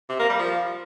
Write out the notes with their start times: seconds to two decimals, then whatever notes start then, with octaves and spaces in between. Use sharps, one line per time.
0.09 C3
0.19 A#3
0.29 G3
0.39 F3